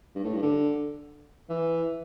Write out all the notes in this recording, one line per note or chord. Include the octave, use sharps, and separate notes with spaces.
G2
A2
G2
D3
E3